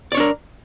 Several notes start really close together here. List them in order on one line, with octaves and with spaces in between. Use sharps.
D5 C#5 D4 A#4